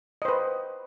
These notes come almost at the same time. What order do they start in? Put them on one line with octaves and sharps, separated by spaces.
D#5 C5 B4